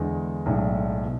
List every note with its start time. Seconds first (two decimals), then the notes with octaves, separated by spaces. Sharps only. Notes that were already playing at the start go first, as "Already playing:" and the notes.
Already playing: E2 D3 G#3
0.46 B1 A2 G#3 D4
1.04 B2